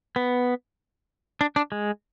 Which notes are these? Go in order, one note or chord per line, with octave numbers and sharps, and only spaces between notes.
B3
D4
D4
G#3